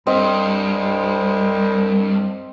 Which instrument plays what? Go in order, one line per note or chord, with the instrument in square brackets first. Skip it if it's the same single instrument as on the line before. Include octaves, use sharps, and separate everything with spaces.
[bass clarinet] C2 [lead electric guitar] G2 [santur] C4 D#5